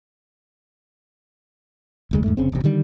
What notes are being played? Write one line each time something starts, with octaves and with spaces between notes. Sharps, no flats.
F1 D2 G#3
E2 G#2 A3
F1 C#3 C4
D1 A1 C3 C4
D3 D#3 G3